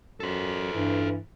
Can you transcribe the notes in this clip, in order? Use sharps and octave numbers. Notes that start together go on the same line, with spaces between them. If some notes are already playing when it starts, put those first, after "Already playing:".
F#2 A4 C5
G2 E3